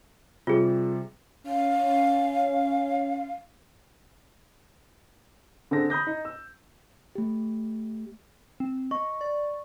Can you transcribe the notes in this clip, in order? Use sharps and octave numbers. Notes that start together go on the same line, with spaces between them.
C3 G3 F4 G#4
C#4 F5
D3 C4 G#4 A4 A#6
B5 D#6 G6 A#6
D#4
E6
A3 G4
C4
D#5 C#6
D5